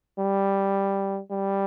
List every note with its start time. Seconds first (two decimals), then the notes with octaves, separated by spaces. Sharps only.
0.19 G3
1.31 G3